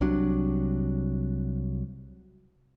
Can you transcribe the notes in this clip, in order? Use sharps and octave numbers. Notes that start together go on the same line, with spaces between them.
C2 C3 F#3 D4